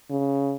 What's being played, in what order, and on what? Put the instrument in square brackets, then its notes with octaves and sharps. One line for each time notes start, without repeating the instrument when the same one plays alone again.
[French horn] C#3